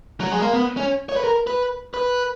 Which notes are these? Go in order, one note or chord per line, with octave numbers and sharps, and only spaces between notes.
F#3
G#3
A#3
B3
C#4
C#5
B4
A#4
B4
B4